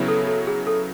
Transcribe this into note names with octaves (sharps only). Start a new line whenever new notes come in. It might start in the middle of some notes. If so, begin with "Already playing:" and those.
Already playing: C#3 F#3 B3 E4
A4
A4
G#4
A4